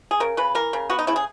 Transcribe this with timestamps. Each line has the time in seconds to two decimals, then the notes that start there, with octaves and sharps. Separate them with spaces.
0.11 G#4
0.20 C#3 A#4
0.37 C#3 B4
0.55 E3 A#4
0.73 C#3
0.90 B3 F#4
0.99 D#4
1.07 C#3 E4
1.16 G#4